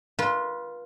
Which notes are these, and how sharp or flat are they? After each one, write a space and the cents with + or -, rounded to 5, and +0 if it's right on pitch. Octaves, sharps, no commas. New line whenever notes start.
F4 +0 B4 -30